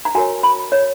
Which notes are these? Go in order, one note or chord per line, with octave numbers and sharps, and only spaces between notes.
A#5
F#4 A#4 C#5 G#5
B5
C#5